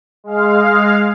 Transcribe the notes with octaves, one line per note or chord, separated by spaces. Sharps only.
G#3 F5